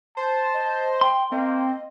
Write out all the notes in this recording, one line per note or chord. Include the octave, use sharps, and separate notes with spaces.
C5 A5
D#5
G5 C6
A#3 C4 D#5